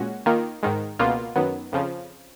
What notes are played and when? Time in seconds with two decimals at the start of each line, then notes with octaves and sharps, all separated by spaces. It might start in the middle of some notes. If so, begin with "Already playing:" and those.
Already playing: A#2 G#3 C#4 F#4
0.26 D#3 A#3 F4
0.63 G#2 D#3 G#3
0.99 C#2 B2 A#3 F4
1.36 F#2 D#3 F#3 B3
1.72 F2 C#3 F3